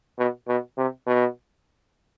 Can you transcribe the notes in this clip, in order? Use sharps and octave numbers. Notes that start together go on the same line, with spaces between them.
B2
B2
C3
B2